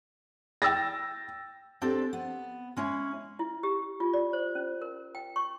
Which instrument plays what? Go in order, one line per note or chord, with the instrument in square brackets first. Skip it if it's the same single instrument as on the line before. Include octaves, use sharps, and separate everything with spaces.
[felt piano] G5 E6 A6 A#6
[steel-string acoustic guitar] C4 D4 G4 A4 D5
B3
G#3 C#4 E4
[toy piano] E4
G4
F4
D5
C5
C#4
A#4
G5
C#6